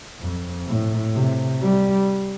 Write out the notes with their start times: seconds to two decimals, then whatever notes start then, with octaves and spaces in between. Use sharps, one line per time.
0.20 F2
0.67 A2
1.14 C3
1.61 G3